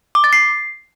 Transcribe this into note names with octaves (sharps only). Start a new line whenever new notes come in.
D6
A6
C7